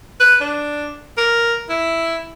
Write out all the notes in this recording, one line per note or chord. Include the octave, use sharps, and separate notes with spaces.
B4
D4
A#4
E4